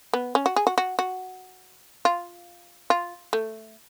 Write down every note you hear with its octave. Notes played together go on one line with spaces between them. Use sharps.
B3
C#4
F#4
G#4
F#4
F#4
F#4
F4
F4
A3